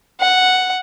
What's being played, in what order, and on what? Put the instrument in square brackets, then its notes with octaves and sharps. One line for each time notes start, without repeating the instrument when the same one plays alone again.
[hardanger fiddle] F#5